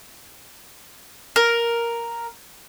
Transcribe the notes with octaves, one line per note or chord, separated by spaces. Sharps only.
A#4